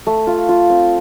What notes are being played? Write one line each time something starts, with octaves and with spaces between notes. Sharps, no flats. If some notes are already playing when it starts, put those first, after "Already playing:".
A3
F4
F4
C4